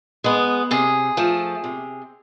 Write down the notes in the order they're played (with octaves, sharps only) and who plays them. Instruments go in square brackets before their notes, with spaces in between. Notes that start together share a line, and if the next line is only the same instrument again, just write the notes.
[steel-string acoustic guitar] G#3 B3
C3 G#4
F3 A3
C3